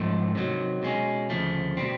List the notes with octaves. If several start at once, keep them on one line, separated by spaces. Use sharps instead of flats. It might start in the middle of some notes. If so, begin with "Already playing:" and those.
Already playing: G#2 F3 A3
C3 D#3 F#3
B2 G#3 C#4
D2 C#3 F3 A3
B2 G3 C4